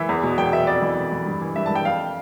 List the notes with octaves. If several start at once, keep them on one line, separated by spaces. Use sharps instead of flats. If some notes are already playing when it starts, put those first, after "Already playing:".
Already playing: E3 E5
E2
B2
E2 G5
B2 E5
F2 D5
E3
F2
E3
G2
E3
G2 E5
E3 A5
G5
F2 F5